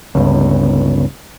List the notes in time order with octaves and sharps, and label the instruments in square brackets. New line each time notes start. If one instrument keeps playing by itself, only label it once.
[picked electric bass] G1 C#2